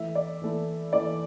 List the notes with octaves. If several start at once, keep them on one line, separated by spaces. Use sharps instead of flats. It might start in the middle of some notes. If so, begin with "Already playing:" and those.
Already playing: E3 A3 E4 E5
D5
E3 A3 E4
E3 A3 E4 D5